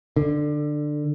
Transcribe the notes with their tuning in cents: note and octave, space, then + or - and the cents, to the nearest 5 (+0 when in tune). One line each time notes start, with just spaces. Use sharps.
D3 +15